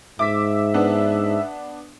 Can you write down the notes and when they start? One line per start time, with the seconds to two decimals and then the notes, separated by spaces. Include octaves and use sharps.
0.19 G#2 E5 D6 B6
0.74 B3 D4